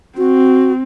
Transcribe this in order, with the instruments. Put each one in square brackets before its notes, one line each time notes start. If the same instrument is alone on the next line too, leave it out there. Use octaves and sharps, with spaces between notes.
[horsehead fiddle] C4 [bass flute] F#4